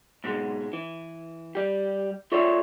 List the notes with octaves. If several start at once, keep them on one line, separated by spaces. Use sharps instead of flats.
G#2 B2 G#3
E3
G3 G4
F4 A4 C#5 D5 E5